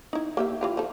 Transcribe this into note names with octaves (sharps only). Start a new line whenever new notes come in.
D#4 E4
A#3 G4 E5
E3 F4 G4
F3 A4